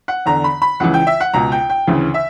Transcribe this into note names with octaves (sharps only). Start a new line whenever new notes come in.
F#5
E2 D3 A#5
B5
B5
C#2 C#3 E3 F#5
G5
E5
F#5
C#2 B2 A#5
G5
G5
D2 C#3 E3
E5